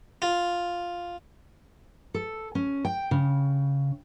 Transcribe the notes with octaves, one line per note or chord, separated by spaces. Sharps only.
F4
A4
C#4
G5
C#3